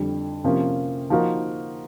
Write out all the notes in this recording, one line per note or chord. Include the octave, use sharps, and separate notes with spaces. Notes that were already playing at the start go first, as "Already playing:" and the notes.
Already playing: F2 D3 G3
C3 F3 A#3 C#4
F3 A#3 D#4 F#4 A#4